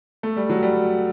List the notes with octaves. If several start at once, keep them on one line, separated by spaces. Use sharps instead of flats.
A3
G3
F#3
G3